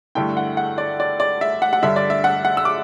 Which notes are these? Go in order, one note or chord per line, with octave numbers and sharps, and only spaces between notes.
G2 D3 A3 E4 G5
F#5
F#5
D5
D5
D5
E5
F#5
F#5
G2 D3 G3 D4 E5
D5
E5
F#5
F#5
E6
D6